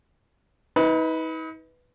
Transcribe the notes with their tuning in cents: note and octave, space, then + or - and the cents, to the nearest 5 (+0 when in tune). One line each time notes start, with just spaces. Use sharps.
D#4 +40 B4 +0